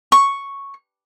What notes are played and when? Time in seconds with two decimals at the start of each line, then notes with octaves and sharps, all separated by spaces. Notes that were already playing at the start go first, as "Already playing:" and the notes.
0.12 C#6